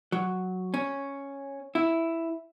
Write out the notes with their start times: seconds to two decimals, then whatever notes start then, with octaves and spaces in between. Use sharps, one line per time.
0.12 F#3
0.74 C#4
1.75 E4